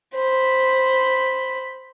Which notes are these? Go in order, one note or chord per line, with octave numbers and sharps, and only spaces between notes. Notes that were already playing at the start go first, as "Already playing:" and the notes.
C5 B5